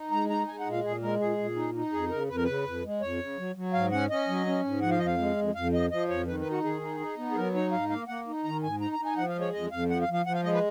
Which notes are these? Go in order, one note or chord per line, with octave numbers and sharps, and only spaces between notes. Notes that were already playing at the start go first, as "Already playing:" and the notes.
Already playing: D#4
G#3 A#5
D#4 A#5
G#3 G#5
F#5
A#2
F5
A#2 G#4
G#3 A#4
A#2 G#4
A#2
D#4
D#4
F2 G#4
C#3 A#4
F2 B4
A#4
C#3 B4
F2
G#3
F2 C#5
C#3
F#3
F#3
G#2 F5
C#4 F#5
C#4 D#5
F#3
C#4
G#2
F3 F#5
F5
F2 D#5
F5
G#3
F2
F2 F5
F3 D#5
F3 D#5
F2 C#5
D#3 B4
B4
D#4
F#4
D#3 G#4
D#4
D#4
B3
G#4
F#3 A#4
D#4 C#5
G#2 F5
A#3 F5
A#3 F#5
D#4
D#3 A#5
G#2 G#5
D#4 A#5
A#5
D#4
G#5
F3 F#5
F5
G#3
C#5
F2 D#5
F2 F5
F3 F#5
F5
F3
F5
F3 F#5
F5
G#3 D#5
B4